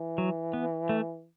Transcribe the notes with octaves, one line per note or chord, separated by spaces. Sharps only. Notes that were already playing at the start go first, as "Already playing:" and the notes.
Already playing: E3
F#3
B3
A3